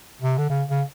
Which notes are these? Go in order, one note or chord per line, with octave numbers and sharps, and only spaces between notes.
C3
D3
C#3
C#3